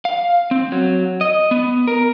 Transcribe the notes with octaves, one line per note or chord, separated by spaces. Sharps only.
F5
C4
F#3
D#5
B3
A#4